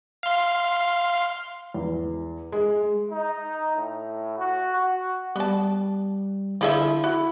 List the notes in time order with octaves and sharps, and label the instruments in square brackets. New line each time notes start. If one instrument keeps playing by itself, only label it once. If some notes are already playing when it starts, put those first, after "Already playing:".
[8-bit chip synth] F5 C6
[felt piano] E2
G#3
[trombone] D#4
A2
F#4
F#4
[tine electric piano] G3 [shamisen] B3 A5
[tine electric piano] D3 E4 [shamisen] F3 G#4 E5
[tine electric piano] E4 [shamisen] F#4